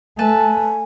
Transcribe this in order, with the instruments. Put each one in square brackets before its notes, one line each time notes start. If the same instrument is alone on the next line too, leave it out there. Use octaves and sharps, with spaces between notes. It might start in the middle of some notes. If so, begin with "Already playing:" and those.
[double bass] A3 [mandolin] B4 A5 [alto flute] G#5